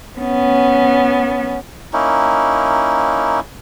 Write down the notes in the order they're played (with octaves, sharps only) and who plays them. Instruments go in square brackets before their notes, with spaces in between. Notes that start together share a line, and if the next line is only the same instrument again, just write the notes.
[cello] B3 C#4
[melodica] A#3 C#4 D#4 E4